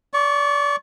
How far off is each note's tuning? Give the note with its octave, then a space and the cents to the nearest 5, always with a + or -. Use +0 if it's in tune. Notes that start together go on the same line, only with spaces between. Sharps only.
D5 -30 C#6 +0